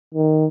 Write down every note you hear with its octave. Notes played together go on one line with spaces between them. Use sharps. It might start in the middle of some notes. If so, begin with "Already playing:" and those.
D#3